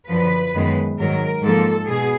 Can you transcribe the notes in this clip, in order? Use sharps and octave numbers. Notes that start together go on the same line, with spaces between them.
F#2 D3 F3 B4
F#2 D#3 G#3 B3
G#2 D#3 F#3 A#4
G#2 F3 A#3 A4
B2 G#4